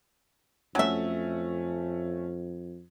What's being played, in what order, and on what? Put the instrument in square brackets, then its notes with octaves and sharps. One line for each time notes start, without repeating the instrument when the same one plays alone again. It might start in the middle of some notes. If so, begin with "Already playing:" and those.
[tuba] F2 [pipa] F#3 E5 [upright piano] A3 C#4